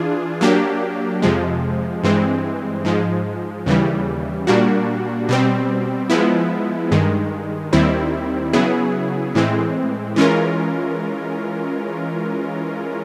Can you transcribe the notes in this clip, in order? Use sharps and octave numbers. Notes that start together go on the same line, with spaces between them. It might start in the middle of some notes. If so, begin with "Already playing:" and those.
Already playing: E3 D4 F4 G#4
F#3 A#3 D4 G4
F2 C3 F3 G#3
G2 E3 G#3 C4
G#2 F3 G#3
D#2 C#3 E3 G3
A#2 G3 A#3 D4 F#4
B2 G3 C4
F3 G#3 B3 E4
G2 D#3 G#3
D#2 D#3 G3 C4 E4
C#3 F#3 B3 E4 G#4
A2 E3 G#3 C4
E3 G#3 C#4 F4 A#4